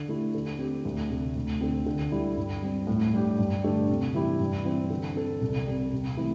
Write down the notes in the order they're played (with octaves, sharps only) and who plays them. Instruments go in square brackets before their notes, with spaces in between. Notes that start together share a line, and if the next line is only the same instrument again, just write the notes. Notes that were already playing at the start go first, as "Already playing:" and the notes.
Already playing: [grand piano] D3
A3 E4 G4
D3
C4 G4
D2
C3 A3
D2
D3 C4
D3
G3 E4 G4
G2
G3 C4
A2
G3 D4 G4
G2
D3 A3 D4 G4
C3
E3 G3 E4 G4
G2
E3 C4
D3
C4 A4
C2
C3 G3
C3
E3 A3 E4 A4